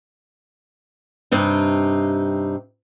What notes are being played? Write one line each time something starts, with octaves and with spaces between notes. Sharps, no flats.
G2 C3 D#4